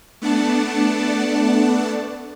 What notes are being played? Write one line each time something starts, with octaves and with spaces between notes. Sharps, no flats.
A3 B3 D4 D5 F#5 A5